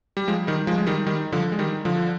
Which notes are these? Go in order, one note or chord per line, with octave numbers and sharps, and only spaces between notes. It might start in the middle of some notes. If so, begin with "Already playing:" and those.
G3
F3 G#3
D#3 G3
F3 G#3
G#3
D#3 G3
D#3 G3
D3 F3
G#3
D#3 G3
D3 F3